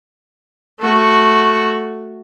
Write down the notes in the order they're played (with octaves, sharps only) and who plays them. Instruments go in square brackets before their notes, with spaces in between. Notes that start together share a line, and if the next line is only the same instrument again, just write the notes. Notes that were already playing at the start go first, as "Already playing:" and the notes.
[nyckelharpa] A3 F#4